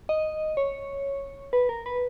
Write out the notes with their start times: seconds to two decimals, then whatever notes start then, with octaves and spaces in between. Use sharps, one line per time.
0.09 D#5
0.57 C#5
1.53 B4
1.69 A#4
1.86 B4